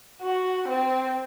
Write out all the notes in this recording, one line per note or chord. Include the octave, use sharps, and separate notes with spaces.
F#4
C4